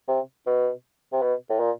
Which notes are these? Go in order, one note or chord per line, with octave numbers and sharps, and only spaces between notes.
C3
B2
C3
B2
A2
A#2